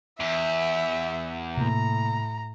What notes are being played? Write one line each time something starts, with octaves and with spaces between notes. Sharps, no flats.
E2 E5
A2 C3 A#3 A#5